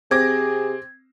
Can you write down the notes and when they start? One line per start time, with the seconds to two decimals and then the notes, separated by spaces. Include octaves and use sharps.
0.11 C3 C4 G#4 D6 G#6 A#6